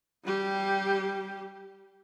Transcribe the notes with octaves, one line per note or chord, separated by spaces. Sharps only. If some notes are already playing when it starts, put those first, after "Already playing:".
G3 G4